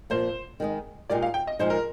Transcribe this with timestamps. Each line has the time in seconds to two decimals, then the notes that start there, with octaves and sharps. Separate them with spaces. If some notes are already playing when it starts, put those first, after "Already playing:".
0.10 A#2 F3 A#3 C5
0.60 D#3 G#3 D#4
1.10 A#2 G#3 D#4 G4 A#4 D5
1.22 F5
1.34 G5
1.47 D#5
1.59 A#2 F3 G#3 D#4 C5
1.70 A#4